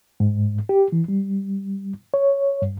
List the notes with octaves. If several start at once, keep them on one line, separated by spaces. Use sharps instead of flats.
G#2
G4
E3
G3
C#5
G2